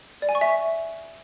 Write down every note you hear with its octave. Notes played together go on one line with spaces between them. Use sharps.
D5
G#5
C#6
E5